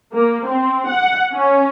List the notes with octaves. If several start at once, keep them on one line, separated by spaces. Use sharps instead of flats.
A#3
C4
F#5
C#4